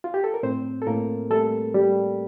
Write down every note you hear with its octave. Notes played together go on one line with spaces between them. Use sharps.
F4
G4
A4
A#4
A2 C4 C5
A4
A2 A#3 A#4
G3 A3 A4
G3